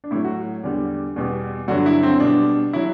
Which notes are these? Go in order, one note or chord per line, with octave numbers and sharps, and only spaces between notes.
D4
A2 F#3 E4
F#4
E2 D3 G3
E2 B2 G3
G2 D3 F#3 F#4
E4
C4
B2 G3 D4
F#3 E4